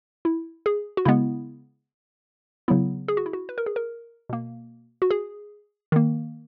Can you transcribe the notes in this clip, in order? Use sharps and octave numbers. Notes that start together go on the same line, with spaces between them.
E4
G#4
F#4
C#3 G#3 B3 E4
C#3 F#3 B3 E4
G#4
F#4
E4
F#4
B4
A#4
G#4
A#4
B2 A#3
F#4
G#4
D#3 A#3